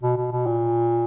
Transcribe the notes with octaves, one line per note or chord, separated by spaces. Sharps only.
B2
B2
B2
A#2